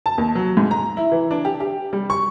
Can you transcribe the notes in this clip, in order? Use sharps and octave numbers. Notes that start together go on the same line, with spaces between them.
A5
D#2
F#3
G#2
A#5
E4
E3
D4
G4
G4
G3
C#6